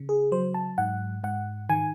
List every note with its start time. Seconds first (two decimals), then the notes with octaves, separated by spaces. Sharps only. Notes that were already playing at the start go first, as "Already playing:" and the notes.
Already playing: C#3
0.09 G#4
0.32 F#3 C5
0.54 A5
0.78 G#2 F#5
1.24 G#2 F#5
1.69 D#3 G#5